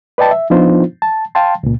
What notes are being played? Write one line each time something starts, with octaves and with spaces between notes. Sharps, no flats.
B4 D5 D#5 G5 A5
E5
F3 B3 D4 D#4 F4 C5
A5
F5 G5 A5 C6
C#2 A#2